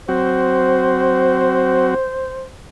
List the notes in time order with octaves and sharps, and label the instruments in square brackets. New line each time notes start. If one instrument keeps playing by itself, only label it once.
[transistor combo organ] F#3 C4 F#4 [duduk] C5